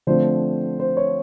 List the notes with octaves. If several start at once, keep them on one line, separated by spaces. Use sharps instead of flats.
D3 F3 A3 C4 C5
C5
C#5